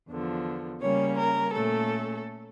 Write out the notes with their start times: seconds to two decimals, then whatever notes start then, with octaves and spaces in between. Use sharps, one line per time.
0.09 E2 D3 F3
0.82 C#3 G3 A#3 C#4 C#5
1.18 A#4
1.54 A#2 A3 C#4 A4